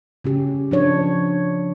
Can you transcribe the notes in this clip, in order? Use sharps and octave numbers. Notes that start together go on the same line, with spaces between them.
C#3 C#4 G4
F3 D4 C#5